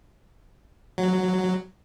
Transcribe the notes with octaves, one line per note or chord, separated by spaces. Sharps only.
F#3